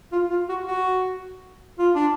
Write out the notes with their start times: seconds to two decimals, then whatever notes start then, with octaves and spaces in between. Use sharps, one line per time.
0.12 F4
0.30 F4
0.49 F#4
0.67 F#4
1.79 F4
1.95 D4